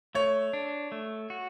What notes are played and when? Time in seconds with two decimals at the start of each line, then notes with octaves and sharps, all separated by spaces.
0.15 A3 C#5
0.53 D4
0.92 A3
1.30 F#4